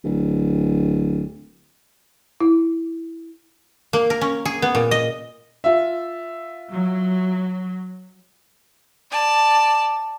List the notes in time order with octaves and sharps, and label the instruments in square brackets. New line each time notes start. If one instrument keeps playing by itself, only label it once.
[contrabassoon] D1
[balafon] E4
[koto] A#3
A#4
C#4
G#4
B3
A#2
D#5
[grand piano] F4 E5
[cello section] F#3
[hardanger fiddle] D5 A5